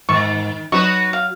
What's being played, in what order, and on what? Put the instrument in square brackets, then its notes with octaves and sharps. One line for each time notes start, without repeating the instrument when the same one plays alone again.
[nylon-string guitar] G#2 [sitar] D#3 [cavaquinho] C#6
[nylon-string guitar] F#3 [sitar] D#4 F#4 B4 [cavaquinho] C#6
[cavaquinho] F5